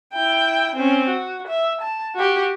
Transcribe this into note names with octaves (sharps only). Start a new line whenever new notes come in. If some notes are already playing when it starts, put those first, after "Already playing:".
E4 G5
C4 C#4
F#4
E5
A5
F#4 G4